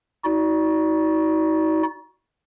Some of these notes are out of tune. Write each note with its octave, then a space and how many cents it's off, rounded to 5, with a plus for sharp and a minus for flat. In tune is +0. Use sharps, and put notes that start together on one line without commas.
D#4 +35 F#4 +0 D5 -15